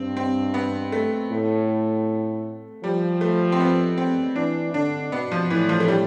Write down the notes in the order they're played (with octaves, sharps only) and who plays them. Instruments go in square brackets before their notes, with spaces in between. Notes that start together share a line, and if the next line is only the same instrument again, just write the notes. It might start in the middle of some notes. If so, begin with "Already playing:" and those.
Already playing: [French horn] G2 [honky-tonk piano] C4
[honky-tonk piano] C4
B3
A3
[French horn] A2
[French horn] F3 [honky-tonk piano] G3
[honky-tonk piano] A3
C4
B3
C4
[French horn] E3 [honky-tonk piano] D4
[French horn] D3 [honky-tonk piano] D4
[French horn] B2 [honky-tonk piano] B3
[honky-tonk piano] F3
[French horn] A2 [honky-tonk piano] E3
[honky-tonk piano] F3
A3
G3